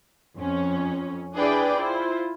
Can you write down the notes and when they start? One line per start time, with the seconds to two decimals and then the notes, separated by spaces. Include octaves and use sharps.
0.37 F2 C#4
1.36 D4 E4 G#4 B4 D5 G5
1.78 E4 F4 C5